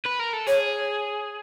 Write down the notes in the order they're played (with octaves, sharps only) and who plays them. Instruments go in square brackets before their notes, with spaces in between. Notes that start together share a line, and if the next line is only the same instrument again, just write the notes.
[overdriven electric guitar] B4
A#4
A4
[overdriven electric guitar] G#4 [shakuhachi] C#5